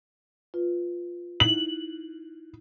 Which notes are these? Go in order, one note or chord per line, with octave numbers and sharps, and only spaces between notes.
F4 B4
D#4 E4 F#7